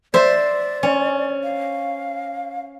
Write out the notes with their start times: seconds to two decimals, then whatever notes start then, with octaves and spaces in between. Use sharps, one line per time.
0.14 C5 D5 E5
0.83 C#4
1.44 F5